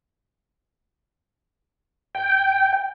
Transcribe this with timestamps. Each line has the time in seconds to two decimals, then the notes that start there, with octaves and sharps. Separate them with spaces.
2.15 G5